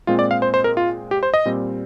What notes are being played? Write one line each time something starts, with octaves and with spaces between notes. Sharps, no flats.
A#2 G#3 C4 F4
D5
F5
C5
C5
A#4
F4
G4
C5
D#5
A#2 G3 C4